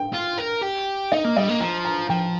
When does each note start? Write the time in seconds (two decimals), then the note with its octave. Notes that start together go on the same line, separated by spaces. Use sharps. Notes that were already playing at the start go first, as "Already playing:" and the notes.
Already playing: G5
0.14 F4
0.39 A#4
0.62 G4
1.12 D#4 D#5
1.24 A#3
1.36 G3 D#5
1.49 A#3
1.60 F3 A#5
1.85 A#5
2.10 F3 G5